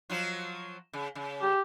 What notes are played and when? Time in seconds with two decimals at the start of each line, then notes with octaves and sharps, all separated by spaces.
0.10 F3 F#3 F4
0.93 C#3
1.15 C#3
1.42 G4